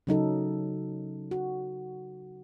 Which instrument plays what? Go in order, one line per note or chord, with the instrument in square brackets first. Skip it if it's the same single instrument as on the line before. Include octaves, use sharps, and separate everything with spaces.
[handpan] C#3 F#3 D#4 A4
F#4